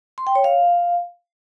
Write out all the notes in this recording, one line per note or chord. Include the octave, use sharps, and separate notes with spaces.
C6
G5
C#5
F5